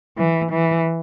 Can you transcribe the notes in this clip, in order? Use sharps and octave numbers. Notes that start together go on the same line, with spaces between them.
E3
E3